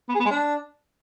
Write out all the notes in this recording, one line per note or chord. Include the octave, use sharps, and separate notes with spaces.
B3
G#4
B3
G#3
D4